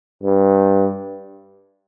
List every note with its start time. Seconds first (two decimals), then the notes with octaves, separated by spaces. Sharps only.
0.23 G2